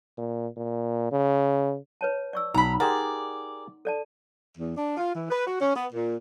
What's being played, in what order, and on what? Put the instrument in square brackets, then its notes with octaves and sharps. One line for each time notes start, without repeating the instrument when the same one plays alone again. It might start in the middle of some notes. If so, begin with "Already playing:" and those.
[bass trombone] A#2
A#2
C#3
[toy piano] B4 C#5 A5
D5 C#6 E6
[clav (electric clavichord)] B1 [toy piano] D#4 [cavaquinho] A#5 B5
[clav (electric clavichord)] G4 G#4 A#4 [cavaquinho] D5 [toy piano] F#5 A#5 C6
[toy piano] A4 D5 A5
[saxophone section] E2
D4
F4
E3
B4
F#4
C#4
B3
A#2